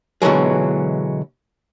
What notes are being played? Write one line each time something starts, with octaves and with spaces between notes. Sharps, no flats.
B2 D3 E3 F#3 G#3